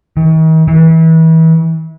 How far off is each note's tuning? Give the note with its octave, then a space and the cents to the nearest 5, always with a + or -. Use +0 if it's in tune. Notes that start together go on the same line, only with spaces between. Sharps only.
D#3 +45
E3 -30